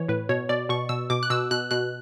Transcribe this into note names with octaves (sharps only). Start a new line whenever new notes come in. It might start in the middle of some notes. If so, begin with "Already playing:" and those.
Already playing: E3 C#5
A2 B4
B2 C#5
B2 D5
B2 C#6
B2 E6
B2 D6
F#6
B2 E6
B2 F#6
B2 F#6